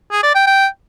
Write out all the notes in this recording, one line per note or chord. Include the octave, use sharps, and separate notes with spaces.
G#4
D5
G5
G5